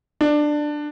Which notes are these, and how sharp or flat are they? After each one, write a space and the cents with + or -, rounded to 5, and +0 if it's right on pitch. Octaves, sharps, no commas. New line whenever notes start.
D4 +15